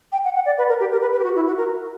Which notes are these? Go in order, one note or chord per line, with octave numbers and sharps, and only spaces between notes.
G5
F#5
F#5
D5
B4
A#4
G4
A#4
B4
B4
G4
F#4
E4
F#4
A#4